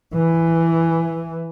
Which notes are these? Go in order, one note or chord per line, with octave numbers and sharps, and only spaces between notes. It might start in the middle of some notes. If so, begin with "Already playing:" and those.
E3